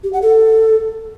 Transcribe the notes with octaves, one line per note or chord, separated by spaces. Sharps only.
G4
F#5
A4